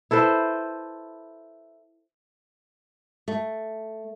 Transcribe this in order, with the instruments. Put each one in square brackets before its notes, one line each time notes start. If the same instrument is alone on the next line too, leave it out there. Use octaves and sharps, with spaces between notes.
[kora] E4 A4 B4 C5
[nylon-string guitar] A3